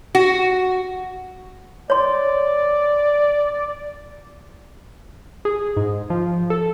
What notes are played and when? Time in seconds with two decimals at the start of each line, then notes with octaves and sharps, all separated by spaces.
0.15 F#4
1.90 C#5 D5 C6
5.45 G#4
5.77 G#2
6.10 F3
6.50 A4